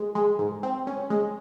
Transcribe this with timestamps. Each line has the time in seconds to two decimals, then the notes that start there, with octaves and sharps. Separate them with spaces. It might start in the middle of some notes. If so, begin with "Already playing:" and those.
Already playing: G#3
0.15 G#3
0.39 G#2
0.63 C4
0.87 C#4
1.10 G#3